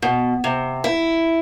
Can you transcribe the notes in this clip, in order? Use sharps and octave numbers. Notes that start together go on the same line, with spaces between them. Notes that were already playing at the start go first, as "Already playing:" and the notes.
B2
C3
E4